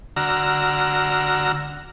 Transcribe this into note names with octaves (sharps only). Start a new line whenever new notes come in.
D3 F#4 A#5 E6 F6